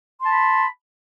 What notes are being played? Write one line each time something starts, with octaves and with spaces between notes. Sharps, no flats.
A5 B5 C6